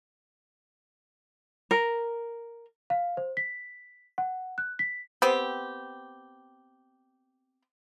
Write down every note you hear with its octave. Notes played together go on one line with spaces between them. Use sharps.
A#4
F5
C5
B6
F#5
F#6
B6
B3 C4 G4